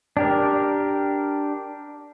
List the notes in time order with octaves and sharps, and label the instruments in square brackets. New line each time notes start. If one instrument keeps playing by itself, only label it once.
[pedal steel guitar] D4 G4 A#4